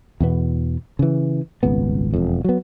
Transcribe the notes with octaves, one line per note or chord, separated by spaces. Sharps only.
E2 B2 B3
C#3 E3
D#1 G#1 C#2 B3
E1 F2
F#3 B3